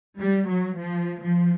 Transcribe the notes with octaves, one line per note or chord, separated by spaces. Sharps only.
G3
F#3
F3
F3